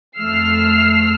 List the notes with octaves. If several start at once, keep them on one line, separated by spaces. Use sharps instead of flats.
F2 A3 E6 F6 C7